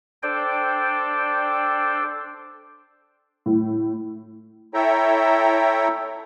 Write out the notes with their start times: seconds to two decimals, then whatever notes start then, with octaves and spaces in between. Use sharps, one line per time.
0.23 D4 A4 C5 D5 G5
3.46 A2
4.74 E4 A4 C#5 E5 G5 A#5